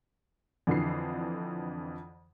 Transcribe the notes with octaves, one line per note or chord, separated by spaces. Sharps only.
F2 D3 E3 C7